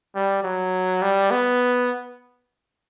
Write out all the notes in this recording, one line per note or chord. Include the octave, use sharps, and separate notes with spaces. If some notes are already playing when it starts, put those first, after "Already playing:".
G3
F#3
G3
B3